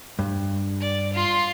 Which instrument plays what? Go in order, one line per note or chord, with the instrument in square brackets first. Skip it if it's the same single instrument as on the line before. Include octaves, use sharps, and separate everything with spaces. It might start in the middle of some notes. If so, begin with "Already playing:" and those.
[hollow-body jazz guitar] G2
[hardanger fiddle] D5
F4 C6